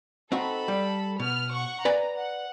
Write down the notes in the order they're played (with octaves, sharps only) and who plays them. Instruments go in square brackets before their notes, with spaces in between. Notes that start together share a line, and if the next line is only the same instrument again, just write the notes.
[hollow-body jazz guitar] C4 D#4 F#4 [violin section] A4 B5
[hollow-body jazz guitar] G3
[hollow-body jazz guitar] B2 [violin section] B3 F6
[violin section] F#5 C#6
[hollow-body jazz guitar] B4 D5 G#5 [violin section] A#5
[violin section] F#5